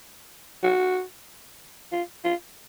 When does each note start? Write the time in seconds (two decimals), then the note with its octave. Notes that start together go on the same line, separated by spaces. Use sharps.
0.63 F#4
1.92 F4
2.24 F4